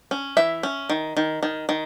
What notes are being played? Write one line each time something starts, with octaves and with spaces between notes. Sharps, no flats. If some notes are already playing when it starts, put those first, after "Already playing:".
C#4
E3 E5
C#4
D#3
D#3
D#3
D#3